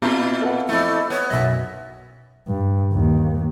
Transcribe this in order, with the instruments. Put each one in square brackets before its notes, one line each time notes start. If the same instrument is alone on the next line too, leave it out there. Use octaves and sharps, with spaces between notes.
[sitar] A#2 E4 F4 [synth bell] B3 C4
[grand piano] A4 B4 F#5
[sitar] F2 A3 [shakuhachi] E4 [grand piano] E5
[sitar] B3 [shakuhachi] C#5
[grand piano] B1 F#2 [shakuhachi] E5 [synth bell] A6 A#6
[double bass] G2
D#2